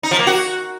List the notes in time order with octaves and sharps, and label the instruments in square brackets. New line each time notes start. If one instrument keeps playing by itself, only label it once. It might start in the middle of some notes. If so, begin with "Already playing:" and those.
[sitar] D#4
F3
A#3
F#4